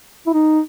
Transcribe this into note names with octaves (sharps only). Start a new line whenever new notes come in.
E4
D#4